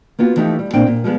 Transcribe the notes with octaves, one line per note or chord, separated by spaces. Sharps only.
A#3 B3 F4 F#4
E3 F3 A3 D#4 G4
G3
A#2 C4 D4 G5
A#2
F3 G3 G#3 B3